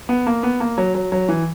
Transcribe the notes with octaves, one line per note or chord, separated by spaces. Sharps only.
B3
A#3
B3
A#3
F#3
F#3
F#3
E3